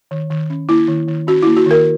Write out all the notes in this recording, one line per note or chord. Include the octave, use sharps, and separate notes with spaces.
D#3
D#3
C#4
A#3 E4
D#3
D#3
C#4 F#4
A#3 E4
F#4
D#3 A#4